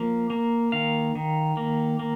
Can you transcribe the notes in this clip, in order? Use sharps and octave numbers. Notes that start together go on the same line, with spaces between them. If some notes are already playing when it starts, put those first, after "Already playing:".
Already playing: F3 A#3
A#3
D#3 F5
D#3
A#3
A#3